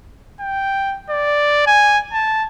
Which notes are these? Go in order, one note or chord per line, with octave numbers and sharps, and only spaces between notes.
G5
D5
G#5
A5